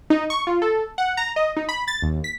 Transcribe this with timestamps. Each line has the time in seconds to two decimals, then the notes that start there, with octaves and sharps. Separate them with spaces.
0.10 D#4
0.30 C#6
0.47 F4
0.62 A4
0.98 F#5
1.17 A#5
1.36 D#5
1.57 D#4
1.69 B5
1.88 A6
2.02 D#2
2.24 B6